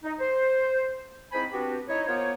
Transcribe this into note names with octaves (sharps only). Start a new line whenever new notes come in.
D#4
C5
G#2 C4 E4 C5 G#5 B5
B3 C4 D4 F#4 G4
D#4 E4 C#5
A#3 B3 F4 C5 C#5